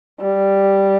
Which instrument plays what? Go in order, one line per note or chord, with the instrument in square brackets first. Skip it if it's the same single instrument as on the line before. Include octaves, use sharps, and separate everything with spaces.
[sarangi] G3